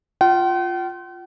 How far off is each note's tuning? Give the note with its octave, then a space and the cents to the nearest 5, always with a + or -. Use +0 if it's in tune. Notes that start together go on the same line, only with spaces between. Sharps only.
F4 +0 G5 -45